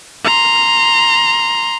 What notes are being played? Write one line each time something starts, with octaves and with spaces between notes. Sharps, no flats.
A#5 C6